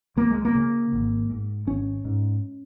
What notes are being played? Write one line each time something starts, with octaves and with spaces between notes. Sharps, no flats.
C#2 A#3
G#3
A#3
C#3
G#1
G#2
G#1 C#4
G#2